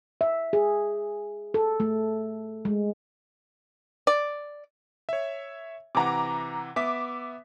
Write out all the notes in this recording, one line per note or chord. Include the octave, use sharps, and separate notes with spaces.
E5
G#4
A4
A3
G#3
D5
C#5 E5
C3 E3 F#5 A#5 D6
B3 E5 D6 B6